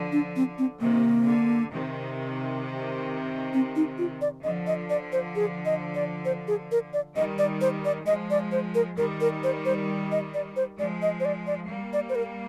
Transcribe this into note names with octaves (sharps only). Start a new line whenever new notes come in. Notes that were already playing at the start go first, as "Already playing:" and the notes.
Already playing: D3 F3
D4
C4
C4
C3 D#3 A#3
D3
C3 D#3
C4
D#4
F4
D5
D3 F3 D#5
D#5
D5
C5
G#4
D#5
D5
C5
G#4
A#4
D5
D#3 G3 D#5
D5
C5
D5
F3 G#3 D#5
D5
C5
A#4
D#3 G3 A#4
A#4
C5
C5
D#5
D5
C5
F3 G#3 D5
D#5
C5
D5
D5
G3 A#3
D5
C5
A#4